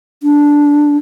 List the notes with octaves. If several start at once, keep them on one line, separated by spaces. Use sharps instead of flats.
D4